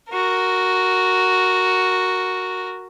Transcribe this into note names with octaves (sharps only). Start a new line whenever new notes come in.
F#4 A#4